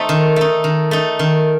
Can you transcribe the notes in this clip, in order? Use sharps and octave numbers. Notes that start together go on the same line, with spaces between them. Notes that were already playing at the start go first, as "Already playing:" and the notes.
Already playing: A3 D#4 C5
D#3
A3 D#4
D#3
A3 D#4
D#3